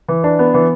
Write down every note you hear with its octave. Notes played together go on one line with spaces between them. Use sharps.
E3
D4
B3
E3